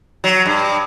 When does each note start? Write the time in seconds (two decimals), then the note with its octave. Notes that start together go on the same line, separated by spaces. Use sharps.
0.24 F#3
0.45 G2